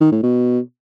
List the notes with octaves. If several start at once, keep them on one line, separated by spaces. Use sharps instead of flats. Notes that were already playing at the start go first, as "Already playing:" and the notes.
D#3
A2
B2